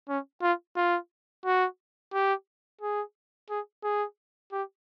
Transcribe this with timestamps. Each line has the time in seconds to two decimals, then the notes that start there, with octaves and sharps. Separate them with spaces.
0.09 C#4
0.42 F4
0.77 F4
1.45 F#4
2.13 G4
2.81 G#4
3.50 G#4
3.84 G#4
4.52 G4